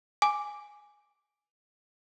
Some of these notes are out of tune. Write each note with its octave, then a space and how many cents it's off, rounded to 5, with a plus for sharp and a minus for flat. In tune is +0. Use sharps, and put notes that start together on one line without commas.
G#5 +0 D6 +0